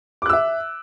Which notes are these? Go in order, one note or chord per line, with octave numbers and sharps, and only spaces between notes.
E5 D6 E6 F#6